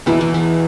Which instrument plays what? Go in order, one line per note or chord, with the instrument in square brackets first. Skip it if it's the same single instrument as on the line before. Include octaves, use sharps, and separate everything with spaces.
[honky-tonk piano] E2 B2 B3 E4 [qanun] E3
[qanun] E3
E3